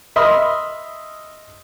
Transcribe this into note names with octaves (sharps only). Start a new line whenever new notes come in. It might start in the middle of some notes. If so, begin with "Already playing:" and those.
D#5 E5 B5 C6 D#6 F6